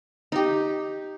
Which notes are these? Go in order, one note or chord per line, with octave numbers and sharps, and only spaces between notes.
D#4 G4